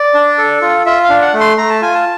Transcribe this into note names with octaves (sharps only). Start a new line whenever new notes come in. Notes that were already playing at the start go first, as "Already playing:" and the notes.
Already playing: D5
D4
A4
F4
F4 E5
F5
D4
F#5
A3
C6
A3 A#5
A5
F4 G#5
A5